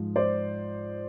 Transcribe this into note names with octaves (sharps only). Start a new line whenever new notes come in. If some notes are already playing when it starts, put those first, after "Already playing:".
Already playing: G#2 F3
C5 D5